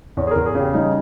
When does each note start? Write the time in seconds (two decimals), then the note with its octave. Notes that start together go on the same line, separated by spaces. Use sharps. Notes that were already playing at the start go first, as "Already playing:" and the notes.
0.17 E2 C#5
0.27 G#4
0.31 E2 A#4
0.46 G#4
0.55 C#3
0.60 G4
0.74 G3 D#4